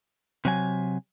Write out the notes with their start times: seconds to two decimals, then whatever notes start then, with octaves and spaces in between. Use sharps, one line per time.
0.45 C3 F#3 G#5